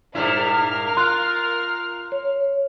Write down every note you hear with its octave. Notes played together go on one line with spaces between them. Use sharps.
G2 A#2 E4 A#4 F5 F6
F4 C6 F#6
C#5